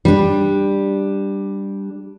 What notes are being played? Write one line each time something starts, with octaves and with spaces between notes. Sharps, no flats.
G3 D4